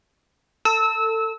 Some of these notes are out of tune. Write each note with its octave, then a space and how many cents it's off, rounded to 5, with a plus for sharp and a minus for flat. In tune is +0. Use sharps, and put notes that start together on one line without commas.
A4 +25 E6 -25